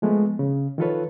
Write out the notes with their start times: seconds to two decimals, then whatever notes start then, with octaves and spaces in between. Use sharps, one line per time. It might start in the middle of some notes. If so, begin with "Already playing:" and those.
0.02 F3 G#3 A3 B3
0.39 C#3
0.78 D#3 F3 F4 A4 B4 C#5